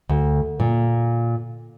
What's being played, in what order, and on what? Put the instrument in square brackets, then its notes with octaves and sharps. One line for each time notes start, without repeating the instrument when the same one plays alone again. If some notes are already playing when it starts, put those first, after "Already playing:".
[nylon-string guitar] D2
A#2